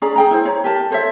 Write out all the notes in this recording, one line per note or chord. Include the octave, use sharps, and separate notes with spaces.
C#4 G#4 D5 A#5
G#4 G5 A#5
E4 C5
C#5 A#5
G4 A#4 A5
A4 C5 C#5 E5